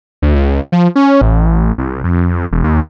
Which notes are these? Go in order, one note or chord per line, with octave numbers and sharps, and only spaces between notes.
D2
C#2
F3
C#4
A1
C2
F2
E1
D#2